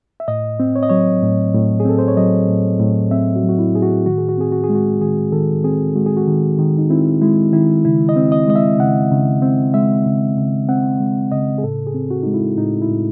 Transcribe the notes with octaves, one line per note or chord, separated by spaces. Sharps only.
E5
A2 D#5
C4
C#5
D#5
F#3 C#5
A2
A2
G#4
C4 A4
C5
C#5
F#3 D#5
A2
A2
C4 E5
F#4
F#3
F#4
E4
A2 G#4
F#4
D#3 F#4
G#4
F#4
C4 G#4
F#4
G#4
G#3
F#4
D#3 G#4
D#3 A4
C4 G#4
G#3 F#4
G#4
F#4
D#3
D#3
D#4
C4 E4
G#3 E4
D#3 E4
C#3 E4
D#5
C4
D#5
G#3 D#5
E5
C#3 F#5
C#3
C4
G#3 E5
C#3
C#3
C4 F#5
G#3
C#3 D#5
G#4
A2 A4
G#4
C4
F#4
G#3 D#4
E4
A2 D#4
E4
A2